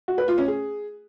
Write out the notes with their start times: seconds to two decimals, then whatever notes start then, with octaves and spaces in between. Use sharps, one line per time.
0.08 F#4
0.18 B4
0.28 F4
0.38 C#4
0.48 G#4